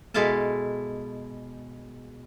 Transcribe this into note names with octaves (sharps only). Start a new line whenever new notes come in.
B2 G#3 E4 A4 F5 A5